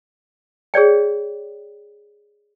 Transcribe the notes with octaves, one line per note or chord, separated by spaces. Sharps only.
G#4 C#5 D5 G5